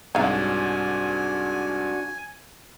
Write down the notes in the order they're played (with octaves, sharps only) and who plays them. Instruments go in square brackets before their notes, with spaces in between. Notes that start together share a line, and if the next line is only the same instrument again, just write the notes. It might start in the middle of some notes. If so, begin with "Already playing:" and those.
[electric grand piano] C2 G#2 [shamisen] F#3 F5 [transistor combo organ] D4 F#4 [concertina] G#5